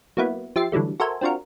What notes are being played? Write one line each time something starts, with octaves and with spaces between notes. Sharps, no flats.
F#3 A#3 B3 E4
F3 G4 E5 A6 C7
D3 E3 F#3 G3 A3
F#4 A4 A#4 C5 E5 G#5
C4 D4 F4 F#4 A#4